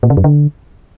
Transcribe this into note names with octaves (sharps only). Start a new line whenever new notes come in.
A#2
C#3
F#2
D3